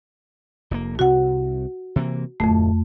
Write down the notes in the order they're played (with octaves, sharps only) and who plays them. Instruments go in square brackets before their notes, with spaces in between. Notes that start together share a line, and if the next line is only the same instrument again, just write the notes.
[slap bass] F1 A#2 A#3
[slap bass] C2 C3 [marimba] F#4 F#5
[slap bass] C3 E3 A#3
[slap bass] D1 [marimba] F2 A3